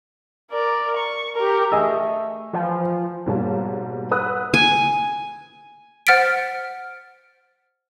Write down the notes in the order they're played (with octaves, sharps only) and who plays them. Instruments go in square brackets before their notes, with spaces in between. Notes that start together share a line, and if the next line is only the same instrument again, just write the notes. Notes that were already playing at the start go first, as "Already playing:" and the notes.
[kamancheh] A#4 D5
C#6
G4 A#4
[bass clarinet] A3 [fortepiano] G#4 D#5 E6
[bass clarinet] E3 [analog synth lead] F3
[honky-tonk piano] G#2 B2 G3 A#3 C#5 A5
B4 F#5 D#6 E6 F#6
[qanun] G#5
[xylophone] C5 F#5 F6 A6 B6 D7